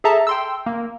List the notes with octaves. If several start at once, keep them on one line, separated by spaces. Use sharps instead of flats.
G#4 A4 E5 A5 A#5
G5 C6 E6
A#3